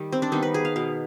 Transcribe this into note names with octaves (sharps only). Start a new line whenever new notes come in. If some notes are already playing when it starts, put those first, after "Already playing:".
Already playing: D#3 G3
C4
D4
D#3 G3 B3 D#4
B4
G#4
F5
B2 B3 F5